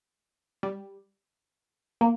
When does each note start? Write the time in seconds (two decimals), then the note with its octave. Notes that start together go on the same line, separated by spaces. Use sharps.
0.63 G3
2.01 A#3